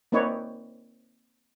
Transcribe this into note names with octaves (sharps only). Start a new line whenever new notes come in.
A#3 C4 D#4 B4 C#5 D5